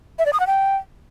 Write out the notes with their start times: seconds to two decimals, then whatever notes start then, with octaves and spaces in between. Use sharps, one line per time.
0.19 E5
0.26 D5
0.33 D#6
0.40 F#5
0.47 G5